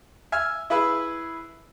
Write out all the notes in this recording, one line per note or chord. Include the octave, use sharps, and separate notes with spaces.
E5 G#5 F6
E4 G#4 B4 E5